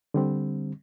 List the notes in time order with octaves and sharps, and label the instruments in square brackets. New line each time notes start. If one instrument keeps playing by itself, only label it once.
[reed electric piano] D3 G3 C4